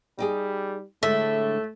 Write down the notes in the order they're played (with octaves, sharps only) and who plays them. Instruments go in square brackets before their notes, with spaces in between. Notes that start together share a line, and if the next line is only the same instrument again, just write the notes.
[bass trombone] G3 [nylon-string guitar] D#4 G4 G#4
[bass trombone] A2 [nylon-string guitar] D3 G#3 [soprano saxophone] A3 [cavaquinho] E5